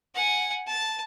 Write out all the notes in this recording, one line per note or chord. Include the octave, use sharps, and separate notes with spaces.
F#5 G#5
A5